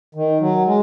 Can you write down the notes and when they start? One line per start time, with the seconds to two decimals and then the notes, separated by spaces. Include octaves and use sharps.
0.15 D#3
0.40 F#3
0.66 G#3